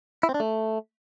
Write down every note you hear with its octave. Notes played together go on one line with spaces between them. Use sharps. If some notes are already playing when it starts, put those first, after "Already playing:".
E4
C4
D4
A3